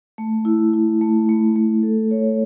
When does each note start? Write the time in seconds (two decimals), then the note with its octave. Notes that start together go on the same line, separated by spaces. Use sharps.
0.18 A3
0.45 E4
0.73 E4
1.01 A3
1.29 A3
1.56 A3
1.83 A4
2.11 C#5